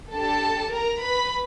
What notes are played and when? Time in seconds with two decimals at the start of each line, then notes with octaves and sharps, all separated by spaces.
0.13 D4 G4 A4 A5
0.74 A#4 A#5
1.04 B4 B5